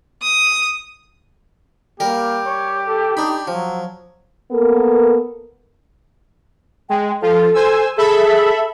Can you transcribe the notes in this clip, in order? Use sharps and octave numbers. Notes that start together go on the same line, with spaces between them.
D#6
G3 A#3 G4 A#4
C#5
A4
D4 D#4 B5
F3 F#3
A#3 B3 A4 A#4
G#3 G5
F3 F4 A4
C5 G#5 E6
G#4 A4 E5 B5